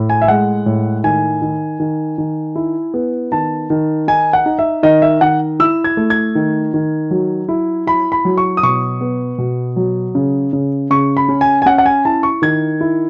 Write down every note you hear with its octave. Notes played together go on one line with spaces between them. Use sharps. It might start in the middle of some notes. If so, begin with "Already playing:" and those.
Already playing: A2
G#5
E5
G#3 F#5
A2
D#3 G#5
D#3
D#3
D#3
E4
B3
D#3 A5
D#3
D#4 G#5
F#5
D#4
E5
D#3 D#5
E5
D#3 F#5
E4 E6
G#6
A3
G#6
D#3
D#3
F#3
E4
E4 B5
B5
F#3
C#6
D#6
B2 C#6
B3
B2
F#3
C#3
C#3
C#3 C#6
B5
C#4
G#5
G#5
C#4 F#5
F#5
G#5
E4 A5
C#6
D#3 G#6
E4